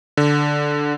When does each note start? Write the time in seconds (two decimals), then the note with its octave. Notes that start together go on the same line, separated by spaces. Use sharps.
0.17 D3